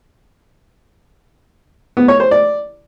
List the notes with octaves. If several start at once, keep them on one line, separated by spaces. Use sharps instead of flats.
B3
C#5
C5
D5